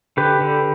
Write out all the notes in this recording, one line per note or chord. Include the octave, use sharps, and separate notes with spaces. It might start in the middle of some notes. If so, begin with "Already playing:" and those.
D3 G4 B4
D3